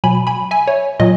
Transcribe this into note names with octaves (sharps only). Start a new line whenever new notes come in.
B2 F#3 G#5 B5
G#5 B5
E5 G#5
C#5
A#2 F#3 D#5